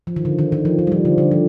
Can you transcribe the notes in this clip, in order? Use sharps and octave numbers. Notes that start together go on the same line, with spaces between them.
F3
D#3
D3
D#3
D#3
F3
D#3
G3
F3
D3
D3
F3